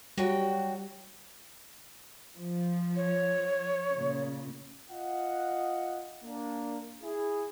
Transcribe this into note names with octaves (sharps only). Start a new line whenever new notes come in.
F#3 G3 F#4 G5
F3
C#5
A#2 C#3
F4 D#5 F5 F#5
A#3 D4
E4 G#4